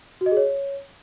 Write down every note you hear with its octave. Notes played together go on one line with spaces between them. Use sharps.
F#4
D#5
G#4
C#5